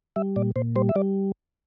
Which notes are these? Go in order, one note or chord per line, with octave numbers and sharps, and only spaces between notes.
G3 E5
A#2 D5
A#2 C5
G3 C5
E5
G3 D5